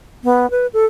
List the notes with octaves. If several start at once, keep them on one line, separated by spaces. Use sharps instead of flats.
B3
B4
A4